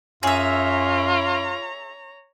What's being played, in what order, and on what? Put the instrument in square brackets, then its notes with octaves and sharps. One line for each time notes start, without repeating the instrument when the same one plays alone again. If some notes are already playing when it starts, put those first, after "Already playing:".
[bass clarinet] F#2 [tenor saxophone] F4 [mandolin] G#4 E5 [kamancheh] C#5 A#5